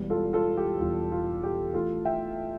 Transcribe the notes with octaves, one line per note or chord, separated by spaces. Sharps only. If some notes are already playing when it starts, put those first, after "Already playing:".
Already playing: E1 E2 E3 G3
F4 A4
F4 A4
G4
E1 E2 E3 G3 F4
F4
G4
A1 A2 E3 F4 A4
E5 G5